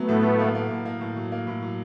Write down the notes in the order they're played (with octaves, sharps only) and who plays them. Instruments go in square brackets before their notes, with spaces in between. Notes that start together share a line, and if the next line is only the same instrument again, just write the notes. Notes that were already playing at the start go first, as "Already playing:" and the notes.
Already playing: [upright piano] F#3 [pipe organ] A3 B3
[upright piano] A2
A2
A#3
A#3
A2
A#3
A2
F#3
A#3
A2
F#3